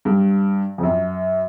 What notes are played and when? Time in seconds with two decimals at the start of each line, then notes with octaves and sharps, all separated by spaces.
0.05 G2
0.78 F2
0.83 F#2